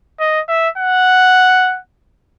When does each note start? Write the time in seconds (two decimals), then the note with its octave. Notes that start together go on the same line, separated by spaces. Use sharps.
0.20 D#5
0.49 E5
0.78 F#5